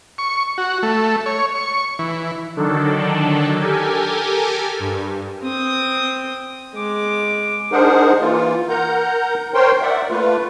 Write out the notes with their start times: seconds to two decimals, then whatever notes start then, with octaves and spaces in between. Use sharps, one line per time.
0.18 C#6
0.58 F#4
0.83 A3
1.26 C#5
1.55 C#6
1.99 E3
2.57 D3 D#3 F#3 D4 A4
3.61 G4 A4 A#4 G#5
4.80 G2
5.42 C4 D#6
6.75 G#3 D6
7.72 D4 D#4 G#4 A#4 C5 F#5
8.21 E3 A#3 F4
8.69 A#4 F#5 A#5 G6
9.54 A#4 C5 C#5 G5 C6
9.82 D5 E5 F#5
10.11 A3 A#3 F4 B4